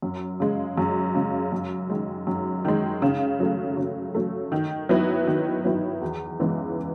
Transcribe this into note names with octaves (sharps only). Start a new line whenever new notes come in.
F#2
C#3 G#3
F#2
C#3 G#3
F#2
D#3 G#3
F#2
D#3 G#3
C#3
F#3 A3
C#3
F#3 A3
D#3
F#3 B3 E4
D#3
F#3 B3 E4
E2
C#3 E3 G#3 B3